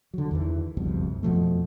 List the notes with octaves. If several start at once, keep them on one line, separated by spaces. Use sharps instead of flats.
D3 F#3
E2 D#3 E3
F#1 C2 F2 B2
F2 B2 F3 A3